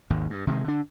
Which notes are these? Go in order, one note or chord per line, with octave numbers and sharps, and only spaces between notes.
G#1 D#2 G#2
G2
C3 D#3 G3 G#3
D3 D4